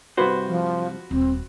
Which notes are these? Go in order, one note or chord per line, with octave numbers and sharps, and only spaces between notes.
C2 G2 F#4 B4 C5
F3
D#1 C4